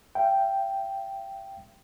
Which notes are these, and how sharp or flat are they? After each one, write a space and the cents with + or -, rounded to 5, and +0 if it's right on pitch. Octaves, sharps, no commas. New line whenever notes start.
E5 +45 G5 -5